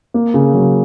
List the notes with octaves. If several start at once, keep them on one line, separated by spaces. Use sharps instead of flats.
A#3
C#3
F#3